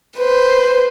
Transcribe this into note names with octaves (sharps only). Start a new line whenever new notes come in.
B4 C5